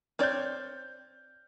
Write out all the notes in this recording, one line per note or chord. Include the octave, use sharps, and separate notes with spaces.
C4 C#5 D5 F6 G6